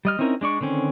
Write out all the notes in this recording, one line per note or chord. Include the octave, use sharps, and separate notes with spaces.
G3 D#5 F6
C4 C#4 D#4 E4 A#4
G#3 D4 D5 C#6
D3 D#3 C4 C#4